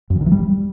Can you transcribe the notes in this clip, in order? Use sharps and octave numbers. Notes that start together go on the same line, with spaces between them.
F#2
E3
D#3
E3
G3